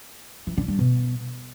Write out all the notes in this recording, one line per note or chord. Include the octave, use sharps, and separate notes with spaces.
E3
D3
G2
B2